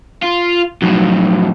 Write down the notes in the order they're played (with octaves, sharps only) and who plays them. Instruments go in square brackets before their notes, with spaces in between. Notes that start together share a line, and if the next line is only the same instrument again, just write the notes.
[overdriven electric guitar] F4
[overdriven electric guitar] F2 A2 [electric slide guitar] F#3 D#4 F#4